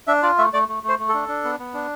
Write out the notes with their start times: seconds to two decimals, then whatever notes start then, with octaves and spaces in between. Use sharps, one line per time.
0.07 D4 E5
0.22 F4 D5
0.38 A3 E5
0.53 A3 D5
0.68 A3
0.83 A3
0.89 C5
0.99 A3
1.09 A4
1.14 D4
1.28 D4
1.45 B3
1.59 B3
1.74 D4